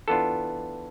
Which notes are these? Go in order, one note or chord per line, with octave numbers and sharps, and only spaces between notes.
E3 B3 D4 F4 A4